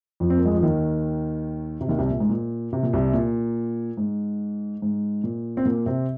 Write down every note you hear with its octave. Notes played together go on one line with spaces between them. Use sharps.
F2 F3
C4
A#3
G#3
F3
D#2 D#3
C3
D#2 D#3
C2 C3
A#2
G#2
A#2
C3
A#2
C2 C3
A#2
G#2
G#2
A#2
C4
A#2 A#3
C3 C4